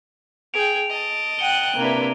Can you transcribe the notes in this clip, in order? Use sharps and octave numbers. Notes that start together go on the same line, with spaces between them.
G#4 G5 D7 F7
D#5 A5
F#5 G5 F#6 D#7 G7
C3 A#3 D4 E4 B4